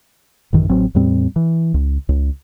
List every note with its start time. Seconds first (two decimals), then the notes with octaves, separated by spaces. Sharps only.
0.53 A1 F#2 D#3 E3
0.69 A1 F#3 C4
0.95 E2 A2 G3 C4
1.36 E3
1.74 C#2
2.09 C#2